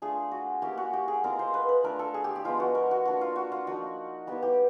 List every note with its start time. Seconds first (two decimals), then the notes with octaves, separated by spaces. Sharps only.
0.02 A3 D4 F4 G#4
0.31 F#4
0.62 A#3 C#4 E4 G4
0.78 F#4
0.93 G4
1.08 G#4
1.24 G#3 C4 F4 A#4
1.39 C5
1.54 B4
1.69 B4
1.84 A3 D4 F4 A#4
1.99 A4
2.14 G#4
2.24 G4
2.35 G4
2.44 F3 G#3 B3 D4 F4
2.60 F#4
2.75 A#4
2.91 F#4
3.05 A#3 D4 F4 F#4
3.21 F4
3.36 F#4
3.52 F4
3.67 F3 A#3 D#4 F#4
4.27 G3 B3 E4 G4
4.43 G4